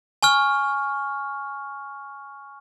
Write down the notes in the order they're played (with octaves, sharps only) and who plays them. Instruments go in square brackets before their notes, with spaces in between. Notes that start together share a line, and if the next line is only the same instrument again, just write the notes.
[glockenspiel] G#5 C#6 F6